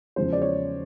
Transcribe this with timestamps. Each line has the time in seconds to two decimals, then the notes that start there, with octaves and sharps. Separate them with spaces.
0.16 E2 C#3 F3 G#3 C5
0.33 D5
0.42 C#5